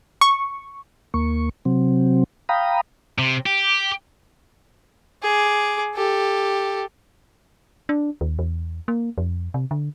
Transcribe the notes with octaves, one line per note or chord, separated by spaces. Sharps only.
C#6
D#2 A#3 C#6
C3 F#3 C4
F5 G5 A#5 B5 D#6
C3
G4
G#4 D6
G4 A4
D4
D#2
E2
A#3
F2
C3
D3